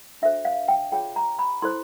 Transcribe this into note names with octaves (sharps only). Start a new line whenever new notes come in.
D4 F#4 A4 C5 E5
F5
G5
F4 G#4 C#5 G5
A#5
B5
E4 A4 C5 C6